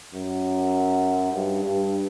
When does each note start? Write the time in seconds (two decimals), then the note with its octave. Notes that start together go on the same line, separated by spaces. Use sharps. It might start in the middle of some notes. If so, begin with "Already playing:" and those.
0.14 F#2
1.33 G2
1.64 G2